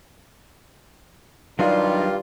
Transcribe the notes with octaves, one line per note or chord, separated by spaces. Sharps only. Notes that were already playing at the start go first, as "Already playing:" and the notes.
G2 D#3 F#3 G3 D4 D#4 F4